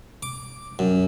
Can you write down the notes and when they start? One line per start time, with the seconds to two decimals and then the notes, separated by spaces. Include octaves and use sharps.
0.23 D6
0.79 F#2